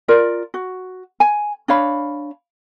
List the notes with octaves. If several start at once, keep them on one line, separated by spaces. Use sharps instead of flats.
F4 A#4 D5
F#4
G#5
D4 C#5 F5 B5